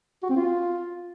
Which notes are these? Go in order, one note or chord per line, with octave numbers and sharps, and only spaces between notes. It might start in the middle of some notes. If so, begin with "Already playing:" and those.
F#4
C4
F4